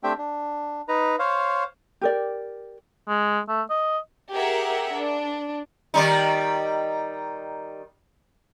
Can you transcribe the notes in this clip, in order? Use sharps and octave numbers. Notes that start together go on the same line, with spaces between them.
A3 C4 D4 G4 E5 G5
D4
D#4 B4 A#5
C5 C#5 F5
G4 A#4 D5
G#3
A3
D#5
G4 G#4 A#4 E5 F#5
D4
D#3 G3 D#4